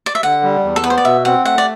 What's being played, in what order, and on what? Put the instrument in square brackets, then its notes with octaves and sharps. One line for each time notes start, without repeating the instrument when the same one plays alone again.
[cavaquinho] D5
E5
[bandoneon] D3 [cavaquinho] F#5
[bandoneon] G3
E2
[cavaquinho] A4
[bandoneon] B3 [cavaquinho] B4
[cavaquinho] C5
D5
[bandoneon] B2 [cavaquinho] E5
[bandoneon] C4 [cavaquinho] F#5
[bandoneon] A3 [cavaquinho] F#5
[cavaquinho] D5